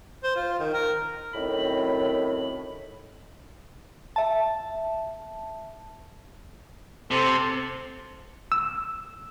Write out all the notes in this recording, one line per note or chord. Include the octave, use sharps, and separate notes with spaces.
C5
F4
D#3
A#4
F#2 A2 D#3 C4 B5
E5 A5
C3 A4 C5
E6